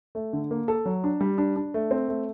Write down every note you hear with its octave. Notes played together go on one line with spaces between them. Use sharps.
A3
D3
A#3
A4
F#3
D4
G3
D4
D4
A3
C4
A3